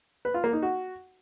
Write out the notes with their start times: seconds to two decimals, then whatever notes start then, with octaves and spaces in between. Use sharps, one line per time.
0.25 B4
0.34 F4
0.44 A#3
0.53 D#4
0.62 F#4